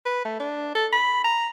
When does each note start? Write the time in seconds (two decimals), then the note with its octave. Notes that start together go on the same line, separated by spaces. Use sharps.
0.06 B4
0.25 A3
0.40 D4
0.75 A4
0.93 B5
1.24 A#5